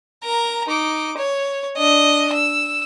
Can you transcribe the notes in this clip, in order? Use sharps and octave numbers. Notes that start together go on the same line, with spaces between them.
A#4 A#5
D#4 D6
C#5
D4 D#5
E6